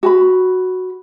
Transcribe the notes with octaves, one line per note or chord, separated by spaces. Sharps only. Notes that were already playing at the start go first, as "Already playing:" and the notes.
F#4 G#5 B5